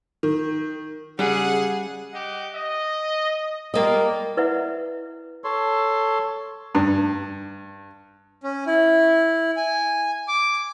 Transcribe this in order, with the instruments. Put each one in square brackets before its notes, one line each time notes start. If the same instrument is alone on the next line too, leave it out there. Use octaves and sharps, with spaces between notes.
[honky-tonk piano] D#3
[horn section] C#3 F#5 [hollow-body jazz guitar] G3 [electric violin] G#4
[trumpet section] G4 D#5 F#5
D#5
[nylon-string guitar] G3 A#3 D#5 [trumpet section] F4
[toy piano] E4 B4 D5 E5 F#5
[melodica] A4 C#5 C6
[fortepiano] G2
[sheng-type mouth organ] C#4
E4
G#5
D6